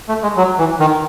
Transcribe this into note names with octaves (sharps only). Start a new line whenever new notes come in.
A3
G#3
F#3
E3
D#3